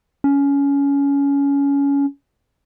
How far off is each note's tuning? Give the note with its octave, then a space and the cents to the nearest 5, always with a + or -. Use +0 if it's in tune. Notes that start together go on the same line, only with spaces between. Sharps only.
C#4 +20